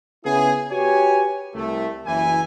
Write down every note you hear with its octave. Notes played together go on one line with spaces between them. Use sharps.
C#3 B3 E4 G#4
F#4 G4 B4 C#5 G#5
C2 A3
F#1 E3 G#5